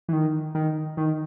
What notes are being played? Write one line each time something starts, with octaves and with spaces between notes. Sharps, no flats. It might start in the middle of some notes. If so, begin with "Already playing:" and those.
E3
D#3
D#3
D#3